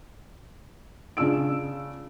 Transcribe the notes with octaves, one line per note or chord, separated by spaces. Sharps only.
C#3 D4 F4 E6 D7